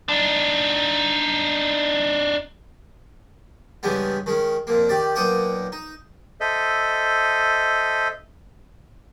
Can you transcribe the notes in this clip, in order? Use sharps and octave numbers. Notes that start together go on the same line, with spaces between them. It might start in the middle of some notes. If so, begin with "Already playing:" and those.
D4 D#4
G2 C#3 E3 G3 G#3 B3
D#3 G#3 C#4
F2 A#2 A#3
D#3 G4 D5
B1 A#2 D#5 F#5 G5 D6
D#4
A4 C5 D#5 E5